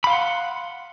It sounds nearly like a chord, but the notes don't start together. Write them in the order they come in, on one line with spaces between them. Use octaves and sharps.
B5 F5 C6 F#5